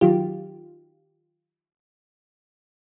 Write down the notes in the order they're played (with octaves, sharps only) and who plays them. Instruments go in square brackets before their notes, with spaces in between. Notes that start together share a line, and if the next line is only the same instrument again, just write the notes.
[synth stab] D#3 F#3 F4 G4